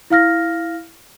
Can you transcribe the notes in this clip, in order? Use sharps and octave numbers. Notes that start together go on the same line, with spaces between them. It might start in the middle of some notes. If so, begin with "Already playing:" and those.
E4 F5 F6 A#6